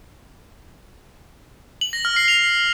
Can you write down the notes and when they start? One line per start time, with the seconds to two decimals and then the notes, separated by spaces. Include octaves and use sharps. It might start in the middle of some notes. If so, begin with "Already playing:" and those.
1.81 F#7
1.93 A#6
2.05 F6
2.16 C7
2.28 F7